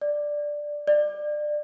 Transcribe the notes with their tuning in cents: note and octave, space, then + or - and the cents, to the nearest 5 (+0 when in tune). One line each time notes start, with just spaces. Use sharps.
D5 +0
D5 +20